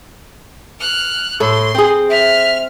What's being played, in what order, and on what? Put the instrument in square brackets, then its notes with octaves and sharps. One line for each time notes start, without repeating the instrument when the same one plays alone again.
[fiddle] F6 F#6
[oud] A2 A4 [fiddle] C6
[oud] C4 G#4
[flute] E5 [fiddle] F6